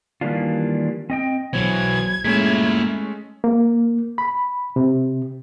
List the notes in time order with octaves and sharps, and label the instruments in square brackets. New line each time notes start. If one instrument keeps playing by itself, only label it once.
[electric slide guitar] D#3 E3 G3 A#3 D4 F4
C4 D#5 G5
[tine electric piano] B1 F#3 C5 [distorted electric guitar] B2 E3 [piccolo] G#6
[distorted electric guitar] A#2 E4 [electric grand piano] G#3 A3 C#4 [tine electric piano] B6
[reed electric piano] A#3
B5
C3